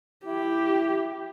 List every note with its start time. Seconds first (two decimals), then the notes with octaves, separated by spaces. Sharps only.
0.26 E4 G4